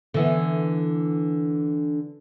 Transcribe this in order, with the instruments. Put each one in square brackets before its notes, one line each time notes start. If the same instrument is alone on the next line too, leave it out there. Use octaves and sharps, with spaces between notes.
[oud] D3 E3 B3